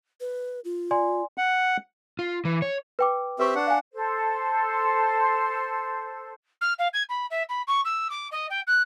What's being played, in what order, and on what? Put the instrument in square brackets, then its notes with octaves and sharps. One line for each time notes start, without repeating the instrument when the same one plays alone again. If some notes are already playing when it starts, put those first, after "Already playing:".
[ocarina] B4
F4
[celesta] D5 G#5 C6
[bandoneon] F#5
[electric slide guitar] F4
E3
C#5
[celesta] B4 G5 D6
[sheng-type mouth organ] C4 G4 E5 [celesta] B4 C#6
[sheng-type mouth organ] D4 F#5
[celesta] F5 G#5
[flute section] A4 C5
[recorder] F6
F5
G#6
B5
E5
B5
C#6
E6
D6
D#5
G5
F#6